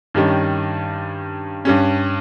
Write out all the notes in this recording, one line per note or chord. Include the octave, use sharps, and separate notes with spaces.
G2 D#3 G3 C#4
G2 G3 C#4